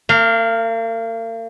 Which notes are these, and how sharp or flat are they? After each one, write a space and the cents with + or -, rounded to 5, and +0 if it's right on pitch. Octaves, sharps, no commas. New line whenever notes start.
A#3 -40 F5 +0